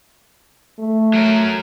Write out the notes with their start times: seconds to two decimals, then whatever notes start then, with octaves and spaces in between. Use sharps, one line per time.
0.79 A3
1.14 F#3 A#4